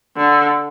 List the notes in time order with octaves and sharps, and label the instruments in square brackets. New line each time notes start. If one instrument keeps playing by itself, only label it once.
[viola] D3